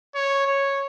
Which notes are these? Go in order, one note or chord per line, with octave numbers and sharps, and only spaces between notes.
C#5
C#5